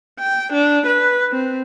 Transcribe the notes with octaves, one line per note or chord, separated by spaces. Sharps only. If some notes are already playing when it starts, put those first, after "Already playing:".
G5
D4
B4
C4